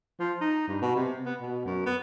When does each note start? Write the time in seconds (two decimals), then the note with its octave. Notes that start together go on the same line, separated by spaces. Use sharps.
0.20 F3
0.41 D#4
0.68 G2
0.82 B2
0.96 C3
1.26 B3
1.41 B2
1.65 F#2
1.86 B3